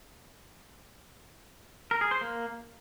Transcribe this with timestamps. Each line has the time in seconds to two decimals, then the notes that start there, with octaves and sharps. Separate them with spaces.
1.91 A#4
2.01 G#4
2.11 C5
2.21 A#3